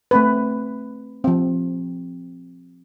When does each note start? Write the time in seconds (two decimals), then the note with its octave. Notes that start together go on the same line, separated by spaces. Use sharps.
0.11 A3 C4 B4
1.24 F3 C4